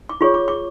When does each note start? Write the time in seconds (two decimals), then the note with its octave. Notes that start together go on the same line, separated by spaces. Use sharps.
0.09 D6
0.21 F4 G#4 C#5 C#6
0.34 D6
0.48 D6